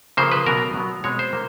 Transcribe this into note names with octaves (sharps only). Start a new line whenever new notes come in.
C#3 F3 A#3 C5
B4
B2 F#3 B3 A#4
B2 F#3 B3
B2 G#3 C4 C#5
C5
A#3